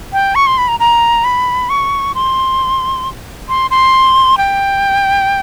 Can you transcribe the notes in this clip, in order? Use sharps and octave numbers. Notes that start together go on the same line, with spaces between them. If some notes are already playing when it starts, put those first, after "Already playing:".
G5
C#6
C6
B5
A#5
A#5
B5
C#6
C6
C6
C6
G5